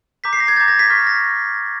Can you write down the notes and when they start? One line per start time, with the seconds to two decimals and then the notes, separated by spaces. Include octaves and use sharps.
0.24 A#5 D6 G6 B6
0.33 C7
0.40 A#6
0.48 G#6
0.56 A#5 D6 G6 A6
0.68 A#6
0.79 B6
0.90 C#6 F6 B6
1.07 A#6